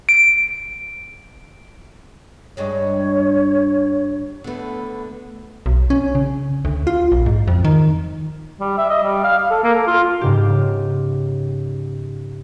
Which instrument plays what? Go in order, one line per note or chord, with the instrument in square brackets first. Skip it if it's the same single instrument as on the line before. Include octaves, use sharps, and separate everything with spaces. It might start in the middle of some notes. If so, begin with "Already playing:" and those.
[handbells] D7
[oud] G2 G#3 D4 [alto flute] C#5
[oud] D3 A3 [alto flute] B3
[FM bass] B1
C#4
C#3
D2
F4
A#1
G#2
F2
D#3
[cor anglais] G3
E5
D#5
G3
F5
F5
A4
A#3
A4
F4
[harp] G#2 C#3 G4